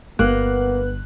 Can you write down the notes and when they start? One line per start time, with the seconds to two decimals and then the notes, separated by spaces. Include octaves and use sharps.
0.19 G1 A#3 B3 F#6